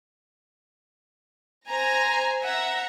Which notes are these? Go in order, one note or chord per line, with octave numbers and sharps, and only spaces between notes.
C5 G#5 A#5
E5 F#5 A#5